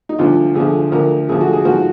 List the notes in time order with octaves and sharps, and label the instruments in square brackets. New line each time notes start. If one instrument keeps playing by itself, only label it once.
[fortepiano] D#4
D2 D3 F3 F4
D2 D3 F3 G#4
D2 D3 F3 A#4
D2 D3 F3 G#4
F#4
G#4
G#2 F3 F#4